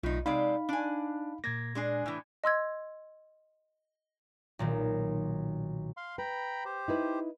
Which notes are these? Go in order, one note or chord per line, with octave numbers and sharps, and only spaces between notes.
B1 A2 D#4 F4
C3 G#3 D#4 D5 F5 B5
D4 G#5
A#2 A#3 G#6 A#6
G#3 D4 G#4
A2 E3
D#5 C6 E6 G#6
B1 A#2 D#3
F5 C6
B4 G5 A#5 B5
G4 C5
D#4 E4 B4